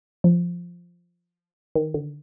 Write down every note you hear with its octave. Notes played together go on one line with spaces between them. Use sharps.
F3
D#3
D3